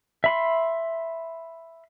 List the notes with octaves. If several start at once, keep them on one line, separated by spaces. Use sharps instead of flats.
E5 B5 C6